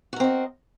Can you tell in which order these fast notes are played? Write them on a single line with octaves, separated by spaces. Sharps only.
F#4 A#4 C4 D#5